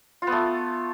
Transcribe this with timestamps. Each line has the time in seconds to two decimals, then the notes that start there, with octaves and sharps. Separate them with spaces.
0.22 F4
0.27 B3
0.32 A3